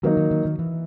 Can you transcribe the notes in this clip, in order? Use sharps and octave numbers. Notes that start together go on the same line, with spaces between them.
D#3 F#3 A#3 D#4
D#3
D#3
D#3
E3